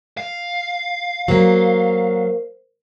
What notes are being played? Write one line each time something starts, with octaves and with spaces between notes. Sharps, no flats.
F5
F#3 A#3 A#4 C5